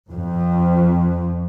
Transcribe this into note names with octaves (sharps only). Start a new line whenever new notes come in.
F2